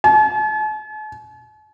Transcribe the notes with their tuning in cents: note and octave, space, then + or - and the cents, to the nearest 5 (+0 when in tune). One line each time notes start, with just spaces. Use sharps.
A5 -45